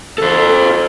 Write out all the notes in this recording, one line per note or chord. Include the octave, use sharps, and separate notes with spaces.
A4 C5